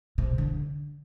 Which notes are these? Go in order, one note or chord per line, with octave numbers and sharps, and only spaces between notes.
C3
D3